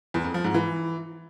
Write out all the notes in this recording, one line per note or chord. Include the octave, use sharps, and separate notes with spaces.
E2
F2
F3
G#2
E3